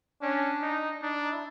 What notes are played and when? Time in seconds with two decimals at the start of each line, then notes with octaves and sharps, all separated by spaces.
0.22 C#4 D4
0.62 D#4
1.02 D4 D#4
1.23 D#4
1.33 E4